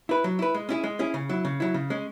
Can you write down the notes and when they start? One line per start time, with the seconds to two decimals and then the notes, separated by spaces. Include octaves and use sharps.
0.09 E4 B4
0.24 F#3
0.39 E4 B4
0.55 G#3
0.69 C#4 E4 G#4
0.84 G#3
0.99 C#4 E4 G#4
1.14 C#3
1.29 F#3 E4
1.45 C#3
1.60 F#3 E4
1.74 C#3
1.90 G#3 C#4